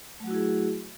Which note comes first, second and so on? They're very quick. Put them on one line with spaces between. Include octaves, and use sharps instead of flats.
A3 F#3 F#4 E4 G#4